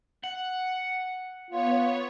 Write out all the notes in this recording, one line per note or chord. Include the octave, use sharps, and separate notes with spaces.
F#5
B3 F4 C#5